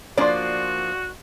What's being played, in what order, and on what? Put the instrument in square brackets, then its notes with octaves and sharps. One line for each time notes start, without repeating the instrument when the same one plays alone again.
[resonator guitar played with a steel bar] F3 A#3 D4 [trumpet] F#4 [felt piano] D5 C6